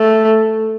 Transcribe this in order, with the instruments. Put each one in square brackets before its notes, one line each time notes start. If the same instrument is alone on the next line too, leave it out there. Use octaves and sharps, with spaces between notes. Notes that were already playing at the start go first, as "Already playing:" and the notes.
Already playing: [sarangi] A3